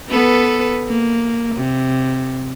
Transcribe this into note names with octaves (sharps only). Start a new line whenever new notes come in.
B3 A4 B4
A#3
C3